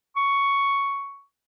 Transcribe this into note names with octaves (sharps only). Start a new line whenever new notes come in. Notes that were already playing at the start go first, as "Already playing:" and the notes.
C#6